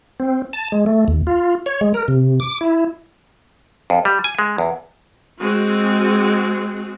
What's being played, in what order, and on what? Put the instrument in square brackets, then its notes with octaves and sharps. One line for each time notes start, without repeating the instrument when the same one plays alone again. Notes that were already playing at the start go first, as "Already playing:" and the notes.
[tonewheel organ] C4
A5
G#3
A3
D#2
F4
C#5
G#3
A#4
C3
D6
E4
[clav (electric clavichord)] F2
G3
G#5
G#3
E2
[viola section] G#3 C4 F#4